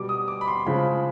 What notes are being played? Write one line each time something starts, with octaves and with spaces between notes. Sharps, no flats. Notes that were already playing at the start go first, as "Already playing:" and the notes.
Already playing: B2 G3 D6
D#6
D6
B5
C6
C#3 F3 G#3 B5